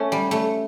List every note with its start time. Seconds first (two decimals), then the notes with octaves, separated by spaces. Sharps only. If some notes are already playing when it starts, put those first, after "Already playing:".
Already playing: A3 C#4
0.12 G3
0.31 A3